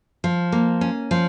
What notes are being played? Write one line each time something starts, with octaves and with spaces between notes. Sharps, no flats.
F3
A#3
C#4
F3